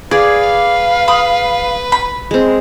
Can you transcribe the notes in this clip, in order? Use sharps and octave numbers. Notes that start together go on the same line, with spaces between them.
G#4 B4 D5 F5
B5 D#6
B5
G#3 C4